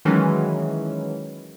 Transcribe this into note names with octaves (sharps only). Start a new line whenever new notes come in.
D#3 E3 F#3 G#3 C#4